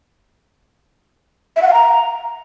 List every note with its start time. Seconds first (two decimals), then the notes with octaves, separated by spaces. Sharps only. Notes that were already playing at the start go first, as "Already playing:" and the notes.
1.56 E5
1.62 F#5
1.68 F5
1.73 A#5